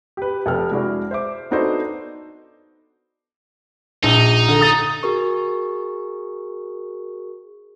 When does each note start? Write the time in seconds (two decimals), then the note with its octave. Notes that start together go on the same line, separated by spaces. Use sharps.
0.17 G4 B4
0.46 F1 A4 G5 F6
0.71 G#3 D4 E4 F#4
1.11 C5 E5 D6
1.51 B3 D4 D#4 F#4 A4 C5
4.04 A#1 D#4
4.48 D3
4.61 D#6 A6
5.03 F#4 G#4 A#4 C#6